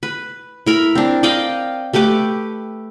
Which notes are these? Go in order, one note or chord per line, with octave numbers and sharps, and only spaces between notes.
B4
E4 A#4 B5
C4 D4
D5 D#5 F5 G5
A3 G4 B4 D6